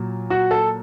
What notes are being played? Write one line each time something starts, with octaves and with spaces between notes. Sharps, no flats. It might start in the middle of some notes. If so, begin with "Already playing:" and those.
Already playing: A#2 F#3
F#4
A4